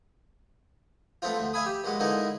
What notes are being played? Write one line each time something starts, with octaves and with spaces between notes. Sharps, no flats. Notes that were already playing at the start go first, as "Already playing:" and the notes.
A3 B3 C4 F4
D2
E5 F5 G#5 B5 D#6
G4
A#2 G#3 B3
D3 G#3 A#3 B3 D#4 E4